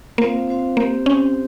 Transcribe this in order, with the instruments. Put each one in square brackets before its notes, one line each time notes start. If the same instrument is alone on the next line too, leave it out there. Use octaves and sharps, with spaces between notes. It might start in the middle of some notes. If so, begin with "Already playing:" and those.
[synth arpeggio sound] A#3 [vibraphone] C4 F4 C5 F5
[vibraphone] C4 F4 C5 F5
[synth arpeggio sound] A#3 [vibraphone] C4 G4 C5
[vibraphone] C4 G4 C5 [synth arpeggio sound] C#4